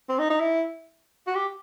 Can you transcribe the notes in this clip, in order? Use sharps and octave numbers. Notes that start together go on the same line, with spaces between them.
C4
D#4
D#4
E4
F#4
G4